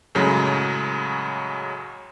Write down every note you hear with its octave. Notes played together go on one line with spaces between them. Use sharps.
F#2 A2 C#3 F#3 G#3